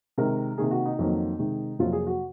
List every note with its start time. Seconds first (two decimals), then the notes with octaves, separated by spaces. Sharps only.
0.18 C3 D#3 G#3 A#4
0.58 C3 D#3 A#3 G#4
0.71 F#4
0.86 D#4
0.99 F2 D#3 F#3 A#3
1.39 C3 D#3 G#3
1.79 F2 C3 F#3 A#3 F4
1.93 G#4
2.07 F#4